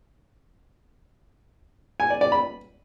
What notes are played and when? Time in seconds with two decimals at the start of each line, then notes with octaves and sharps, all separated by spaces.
2.00 G#5
2.10 D5
2.21 D5
2.32 B5